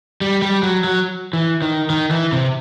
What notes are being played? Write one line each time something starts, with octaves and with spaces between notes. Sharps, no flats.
G3
G3
F#3
F#3
E3
D#3
D#3
E3
C3